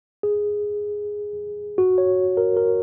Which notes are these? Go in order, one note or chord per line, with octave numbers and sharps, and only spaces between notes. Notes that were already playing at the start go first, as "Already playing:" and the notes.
G#4
F#4
C#5
A#4
A#4